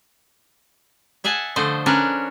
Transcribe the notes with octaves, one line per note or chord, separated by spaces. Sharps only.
G#4 E5 F#5 G#5 A5
D3 F3 A3 C5 D#5
C#4 D4 A#4 B4